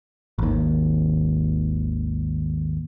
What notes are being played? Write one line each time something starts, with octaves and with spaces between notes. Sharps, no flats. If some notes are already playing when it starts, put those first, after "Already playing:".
G#1 D#2